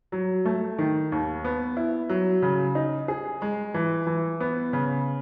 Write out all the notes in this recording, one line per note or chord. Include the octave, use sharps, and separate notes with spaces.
F#3
A3
D#3
D#2
B3
E4
F#3
C#3
D#4
G#4
G#3
E3
E3
B3
C#3